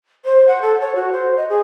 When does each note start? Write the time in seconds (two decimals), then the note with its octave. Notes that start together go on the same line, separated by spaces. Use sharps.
0.25 C5
0.48 F#5
0.62 A4
0.80 C#5
0.95 F#4
1.12 C5
1.37 D#5
1.49 G#4